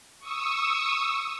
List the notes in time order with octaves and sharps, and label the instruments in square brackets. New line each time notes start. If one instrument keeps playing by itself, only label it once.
[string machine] C#6 D#6 E6